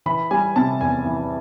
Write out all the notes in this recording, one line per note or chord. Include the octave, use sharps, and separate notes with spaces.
E3 B5
G3 G#5
C3 A5
E2 G#5
E3